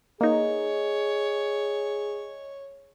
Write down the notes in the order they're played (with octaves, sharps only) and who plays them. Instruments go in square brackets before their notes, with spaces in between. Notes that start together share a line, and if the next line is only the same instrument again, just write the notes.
[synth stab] A#3 D#4 [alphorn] G#4 [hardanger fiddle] C#5 [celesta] D#5